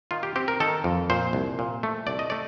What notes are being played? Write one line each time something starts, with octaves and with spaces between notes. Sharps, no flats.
D#3 F4
G4
C4 G4
A#4
D#3 A4
F2
A#2 C5
C2
A#2
A3
C2 D5
D#5
A3 D5